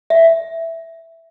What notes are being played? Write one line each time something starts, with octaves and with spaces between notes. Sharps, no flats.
E5